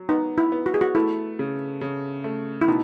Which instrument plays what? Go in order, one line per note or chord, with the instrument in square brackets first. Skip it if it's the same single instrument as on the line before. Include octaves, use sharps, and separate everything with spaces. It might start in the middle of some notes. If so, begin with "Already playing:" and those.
Already playing: [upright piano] F#3
[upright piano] B3 [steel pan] D#4
[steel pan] E4
[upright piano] B3
[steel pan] F#4
G#4
F#4
[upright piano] A3 [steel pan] E4
[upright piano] C#3
C#3
A3
[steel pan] E4
[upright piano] B2 [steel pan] D#4